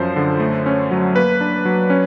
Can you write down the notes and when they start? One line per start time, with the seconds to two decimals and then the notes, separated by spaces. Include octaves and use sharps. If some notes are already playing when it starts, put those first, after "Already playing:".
Already playing: F#2 F3 C5
0.16 D3
0.40 A3
0.66 C#4
0.91 F#3
1.15 A#3 B4
1.41 D4
1.65 F#3
1.90 C#4